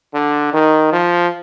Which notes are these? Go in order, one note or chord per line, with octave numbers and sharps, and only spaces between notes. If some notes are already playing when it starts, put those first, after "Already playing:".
D3
D#3
F3